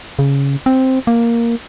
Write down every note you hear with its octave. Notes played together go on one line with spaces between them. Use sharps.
C#3
C4
A#3